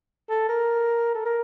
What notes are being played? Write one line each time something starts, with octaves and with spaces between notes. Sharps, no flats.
A4
A#4
A4
A#4